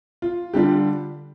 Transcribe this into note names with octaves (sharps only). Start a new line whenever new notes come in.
F4
D3 G3 D4 F4 G4